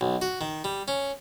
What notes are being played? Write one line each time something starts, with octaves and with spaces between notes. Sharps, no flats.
B1
F#4
D#3
G3
C#4